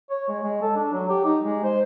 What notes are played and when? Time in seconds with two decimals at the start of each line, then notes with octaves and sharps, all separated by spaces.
0.10 C#5
0.28 G#3
0.43 G#3
0.62 A4
0.76 D4
0.93 F#3
1.09 G4
1.25 D#4
1.43 G#3
1.64 C5